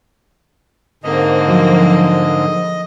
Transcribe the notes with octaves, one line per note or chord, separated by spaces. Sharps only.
G#2 D3 A#3 C4 D#5
F3 F#3